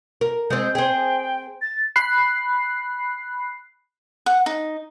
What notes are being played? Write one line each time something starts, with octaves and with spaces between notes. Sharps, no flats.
A#4
G#3 C4 G6
G#4 C5 G5
A6
B5 F#6 C7
F#5
D#4